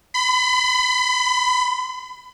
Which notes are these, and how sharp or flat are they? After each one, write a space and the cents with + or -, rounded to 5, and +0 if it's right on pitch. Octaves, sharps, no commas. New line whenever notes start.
B5 +35